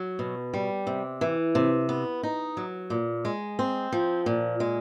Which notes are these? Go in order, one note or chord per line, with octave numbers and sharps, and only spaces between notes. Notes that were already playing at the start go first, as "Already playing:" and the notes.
Already playing: F#3
B2
G3
C3
E3
C3
B3
D#4
F#3
A#2
G#3
C4
F3
A#2
G#3